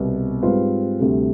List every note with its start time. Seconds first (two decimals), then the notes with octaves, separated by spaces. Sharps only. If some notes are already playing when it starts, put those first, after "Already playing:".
Already playing: C2 B2 B3
0.43 G#2 G3 C4 F4 B4
0.99 D2 C3 G3